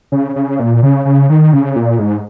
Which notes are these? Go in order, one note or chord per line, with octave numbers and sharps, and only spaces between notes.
C#3
C#3
A#2
C#3
C#3
D#3
C#3
A#2
G#2